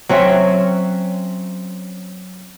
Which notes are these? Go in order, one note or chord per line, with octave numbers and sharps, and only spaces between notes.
F#3 C4 C#4 E5